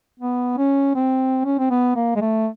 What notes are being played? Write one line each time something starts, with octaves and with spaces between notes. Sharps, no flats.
B3
C#4
C4
C#4
C4
B3
A#3
G#3
A3